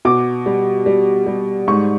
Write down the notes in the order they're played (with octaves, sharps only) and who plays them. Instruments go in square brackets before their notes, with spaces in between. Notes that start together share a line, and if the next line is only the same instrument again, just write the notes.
[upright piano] B2 D6
G3
G3
G3
G#2 C#6